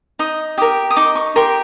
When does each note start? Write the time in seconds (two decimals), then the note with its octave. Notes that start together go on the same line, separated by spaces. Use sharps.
0.19 D#4 D#6
0.58 G4 A#4 D#6
0.90 D#6
0.96 D#4 D6
1.15 C#6
1.36 G4 A#4 C6